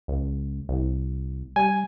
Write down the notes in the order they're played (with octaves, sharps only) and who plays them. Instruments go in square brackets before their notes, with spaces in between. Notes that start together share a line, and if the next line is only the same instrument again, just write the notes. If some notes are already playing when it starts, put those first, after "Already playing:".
[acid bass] C#2
C2
[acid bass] G3 [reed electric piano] G#5